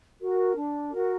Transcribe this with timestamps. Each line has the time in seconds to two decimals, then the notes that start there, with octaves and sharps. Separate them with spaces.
0.20 F#4 A#4
0.56 D4
0.91 F#4 A#4